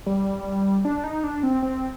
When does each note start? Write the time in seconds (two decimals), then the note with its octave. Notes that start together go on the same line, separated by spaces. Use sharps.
0.06 G3
0.85 D4
1.04 D#4
1.24 D4
1.43 C4
1.63 C4